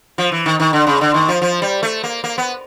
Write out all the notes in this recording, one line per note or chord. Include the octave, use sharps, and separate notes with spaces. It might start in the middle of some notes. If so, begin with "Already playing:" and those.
F3
E3
D#3
D#3
D3
C#3
D3
D#3
F3
F3
G3
A3
A#3
A#3
B3